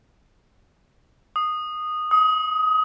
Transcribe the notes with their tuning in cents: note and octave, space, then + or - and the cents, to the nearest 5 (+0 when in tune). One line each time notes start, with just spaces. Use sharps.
D#6 -10
D#6 +25